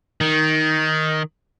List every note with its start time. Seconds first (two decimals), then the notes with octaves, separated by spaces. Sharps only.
0.21 D#3